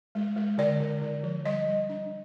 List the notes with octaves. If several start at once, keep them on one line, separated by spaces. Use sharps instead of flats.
G#3
G#3
D3 D5
D3
D3
F3
G3 D#5
G3
D4